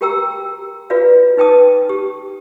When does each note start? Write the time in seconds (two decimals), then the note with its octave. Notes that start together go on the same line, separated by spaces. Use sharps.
0.01 F#4 G4 A#4 G5 A#5 E6
0.90 F4 F#4 B4 D5 F5
1.37 D#4 B4 G5 A5 D#6
1.89 G4